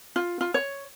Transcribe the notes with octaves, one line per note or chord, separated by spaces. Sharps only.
F4
F4
C#5